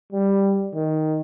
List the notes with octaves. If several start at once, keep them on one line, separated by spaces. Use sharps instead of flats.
G3
D#3